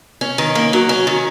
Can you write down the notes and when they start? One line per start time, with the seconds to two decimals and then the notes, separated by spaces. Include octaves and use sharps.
0.21 C#4
0.38 D#3
0.55 A#3
0.73 F#3
0.89 C#4
1.07 D#3